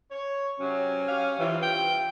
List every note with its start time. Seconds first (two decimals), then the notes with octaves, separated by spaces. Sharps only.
0.10 C#5
0.59 C3 F#3 C#4
1.07 G4 C#5 F5
1.39 G2 C3 E3 F4
1.62 G5